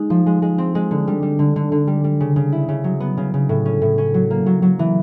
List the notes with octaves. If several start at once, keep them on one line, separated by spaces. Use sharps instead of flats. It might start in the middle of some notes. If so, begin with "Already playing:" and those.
Already playing: G#3 D#4
F3
G#3
G#3
C4
G#3
D3
G3
G3
D3
D3
D3
G3
G3
C#3
C#3
E4
C#3
F#3
B3
C#3
C#3
A2
C#4
A2
C#4
F#3
A#3
F#3
F#3
E3